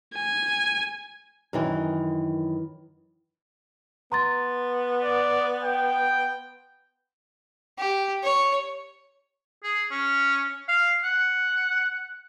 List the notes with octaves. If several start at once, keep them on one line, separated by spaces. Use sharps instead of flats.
G#5
F#2 D#3 E3
B3 A#5 C6 A6
D5
G5
G4
C#5
G#4
C#4
F5
F#5